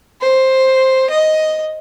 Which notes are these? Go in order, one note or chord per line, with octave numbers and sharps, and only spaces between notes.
C5
D#5